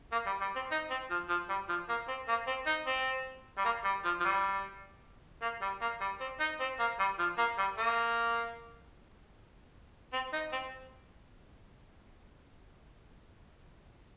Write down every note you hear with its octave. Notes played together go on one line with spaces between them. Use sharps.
A#3
G3
G3
C4
D#4
C4
F3
F3
G3
F3
A#3
C4
A#3
C4
D#4
C4
G3
A#3
G3
F3
F3
G3
A#3
G3
A#3
G3
C4
D#4
C4
A#3
G3
F3
A#3
G3
A#3
C4
D#4
C4